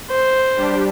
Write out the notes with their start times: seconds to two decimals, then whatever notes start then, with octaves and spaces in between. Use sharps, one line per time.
0.10 C5
0.57 G3 D4 G4